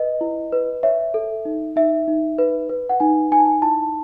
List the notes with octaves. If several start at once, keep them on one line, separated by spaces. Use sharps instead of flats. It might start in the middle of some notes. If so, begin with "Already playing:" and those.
Already playing: B4 D#5
E4
B4
C#5 E5
A4
D#4
D#4 E5
D#4
B4
B4
F#5
D#4 G#5
D#4 G#5
A5
G#5
E4 A5